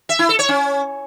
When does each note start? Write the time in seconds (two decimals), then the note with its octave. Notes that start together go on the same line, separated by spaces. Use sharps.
0.09 E5
0.19 E4
0.29 A4
0.39 C#5
0.49 C#4